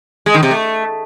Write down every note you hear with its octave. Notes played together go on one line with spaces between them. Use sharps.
G#3
D#3
C3
A3